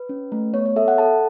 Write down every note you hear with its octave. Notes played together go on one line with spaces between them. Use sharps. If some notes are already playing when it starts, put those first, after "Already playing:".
Already playing: B4
C#4
A3
B3 C#5
C#5
A4 E5
F#5
A4 A5